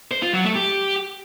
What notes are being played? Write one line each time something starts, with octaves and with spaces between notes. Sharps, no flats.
C5
F4
F#3
A3
G4